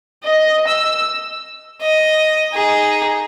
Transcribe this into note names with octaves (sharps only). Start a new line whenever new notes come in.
D#5
E6
D#5
D#4 G#4